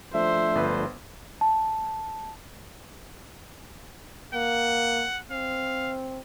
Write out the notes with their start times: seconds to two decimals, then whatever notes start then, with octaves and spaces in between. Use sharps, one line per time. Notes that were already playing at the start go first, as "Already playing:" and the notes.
0.14 F3 A3 D4 C5 E5
0.55 G1 B4
1.41 A5
4.34 A#3 F#5
5.31 C4 F5